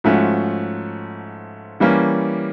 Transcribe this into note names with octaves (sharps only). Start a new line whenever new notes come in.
G#2 F3 A3 C#4 F#4
E3 G3 A#3 C#4